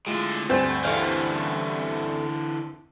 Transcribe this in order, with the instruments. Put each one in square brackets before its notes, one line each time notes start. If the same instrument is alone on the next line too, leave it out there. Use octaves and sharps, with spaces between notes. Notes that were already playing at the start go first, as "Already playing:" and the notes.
[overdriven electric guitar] A2 D3 [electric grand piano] G#3 F4 E7
[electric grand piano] D2 G2 G#5 [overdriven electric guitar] A3 [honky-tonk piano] C4 C5
[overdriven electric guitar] D3 E3 [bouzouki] A3 F5